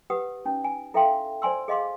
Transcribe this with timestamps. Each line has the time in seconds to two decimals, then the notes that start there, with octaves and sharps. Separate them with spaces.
0.10 G4 B4 F#5 D#6
0.45 C#4 D#4
0.64 G#5
0.94 E4 A4 E5 F5 G5 C6
1.42 C5 D5 G#5 C6 E6
1.68 G#4 D#5 F5 C6 D6